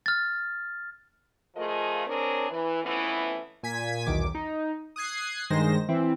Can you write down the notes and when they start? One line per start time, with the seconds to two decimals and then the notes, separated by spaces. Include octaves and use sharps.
0.06 F6 A6
1.56 F3 A3 F4 G#4 A#4 D#5
2.07 C4 D4 G#4 A#4 C#5
2.51 E3
2.84 F2 E3 A3 B3 C#4 E4
3.63 A#2 G#5 G#6 B6
4.06 B1 E2 D#3 D6
4.35 D#4
4.96 D#6 F#6 G#6 C7
5.50 G2 D#3 G#3 C5 A#6
5.88 E3 C4 E4